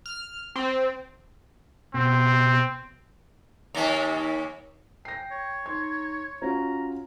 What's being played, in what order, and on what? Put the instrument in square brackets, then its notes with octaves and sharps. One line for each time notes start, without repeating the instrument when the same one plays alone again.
[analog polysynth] F6
C4
[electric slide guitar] B2 [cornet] C4
[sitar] D#2 C#4
[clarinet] G5 [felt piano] A#6 C7
[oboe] C#5
[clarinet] D#4 [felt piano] C6 G#6
[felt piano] C#4 F4 F#4 [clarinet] A#5